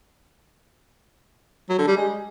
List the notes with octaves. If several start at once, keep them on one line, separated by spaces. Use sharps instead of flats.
F#3
D3
G3
G#3